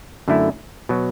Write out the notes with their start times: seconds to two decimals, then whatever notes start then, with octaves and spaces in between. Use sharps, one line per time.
0.28 F#2 D3 A3 E4
0.89 B2 F#3